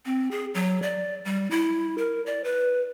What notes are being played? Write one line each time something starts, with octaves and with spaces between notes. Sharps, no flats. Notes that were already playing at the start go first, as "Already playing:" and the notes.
C4
G#4
F#3
D5
G3
E4
A#4
D5
B4